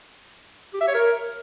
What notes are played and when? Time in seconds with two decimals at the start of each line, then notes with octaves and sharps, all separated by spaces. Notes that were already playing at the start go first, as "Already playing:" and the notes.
0.74 G4
0.81 E5
0.88 C#5
0.95 A#4